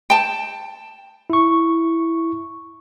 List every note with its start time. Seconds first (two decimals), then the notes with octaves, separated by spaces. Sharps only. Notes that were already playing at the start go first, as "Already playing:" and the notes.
0.10 G5 A5
1.30 E4 C#6